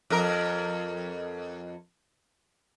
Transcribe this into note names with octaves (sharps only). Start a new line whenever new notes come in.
F2 A#4